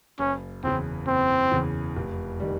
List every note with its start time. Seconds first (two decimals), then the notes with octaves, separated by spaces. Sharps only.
0.19 F#1 C#4
0.63 E2 C#3 E3 C4
1.07 F#1 C4
1.52 E2 C#3 E3
1.96 F1
2.40 D#3 G3